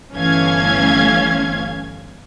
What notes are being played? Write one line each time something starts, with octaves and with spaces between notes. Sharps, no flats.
G1 E3 A3 C#4 F5 G#6